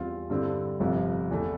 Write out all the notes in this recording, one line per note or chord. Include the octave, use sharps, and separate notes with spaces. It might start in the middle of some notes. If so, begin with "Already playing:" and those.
Already playing: E2 E3 G3 C4 F4
G2 D3 G3 C4 E4
G1 F2 C3 F3
E2 E3 A3